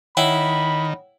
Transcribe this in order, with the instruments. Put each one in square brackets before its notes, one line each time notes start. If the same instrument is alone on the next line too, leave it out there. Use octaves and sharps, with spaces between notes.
[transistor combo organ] D#3 [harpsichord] E4 [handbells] C#5 F#5 G5 [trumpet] B5